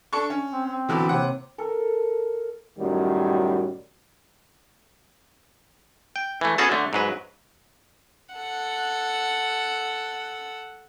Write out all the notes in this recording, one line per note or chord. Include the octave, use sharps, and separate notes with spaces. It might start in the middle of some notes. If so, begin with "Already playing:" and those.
D4 A4 C#6
C#4
C4
C4
B2 D3 E3 F#3 E4 D6
D#2 C3 F#5
A4 A#4
F#2 A2 D#3 F#3 G3
G5
E3 A3
B3 C#4 F#4 G#4 A4 A5
D3 A3
G#2 F#3 B4
A4 F#5